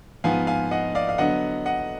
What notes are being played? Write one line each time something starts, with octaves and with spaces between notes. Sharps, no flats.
G#2 F3 B3 F5 G#5
F5 G#5
D#5 F#5
D5 F5
F5
D3 F#3 B3 D#5 F#5
D#5 F#5